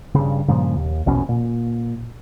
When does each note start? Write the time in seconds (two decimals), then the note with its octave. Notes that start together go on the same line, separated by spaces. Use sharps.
0.15 G2 C#3
0.48 G2 A#2 C#3 F3
0.76 D#2
1.06 A#1 E2 B2 C#4
1.29 A#2